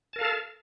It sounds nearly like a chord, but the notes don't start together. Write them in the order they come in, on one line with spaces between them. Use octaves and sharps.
A5 A#4 F5 A4